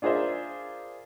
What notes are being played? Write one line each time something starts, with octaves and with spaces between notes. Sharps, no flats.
D4 F4 G#4 A#4 C5 E5